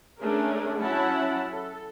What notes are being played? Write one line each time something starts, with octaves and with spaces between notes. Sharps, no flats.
A3 C#4 D4 G#4 A#4
F#3 C#4 E4 F#5 A5 B5
A4